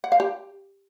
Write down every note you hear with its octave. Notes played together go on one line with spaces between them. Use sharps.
F#5
F5
G4